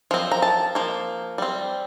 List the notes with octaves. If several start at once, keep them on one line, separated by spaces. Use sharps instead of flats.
F3 C4
A#5
A5
F3 A#3
G3 C4